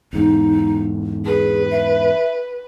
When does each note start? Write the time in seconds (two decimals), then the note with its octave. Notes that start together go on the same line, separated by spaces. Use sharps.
0.13 E2 G#2 D#4
1.25 G#4 B4
1.71 E5